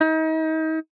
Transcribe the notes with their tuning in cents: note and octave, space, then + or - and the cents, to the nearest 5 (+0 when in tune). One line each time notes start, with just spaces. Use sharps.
D#4 +35